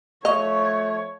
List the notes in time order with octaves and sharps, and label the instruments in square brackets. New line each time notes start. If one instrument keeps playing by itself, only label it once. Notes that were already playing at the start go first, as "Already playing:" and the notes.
[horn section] F3 A3 [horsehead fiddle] C#5 [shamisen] D#5 [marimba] F5 C#6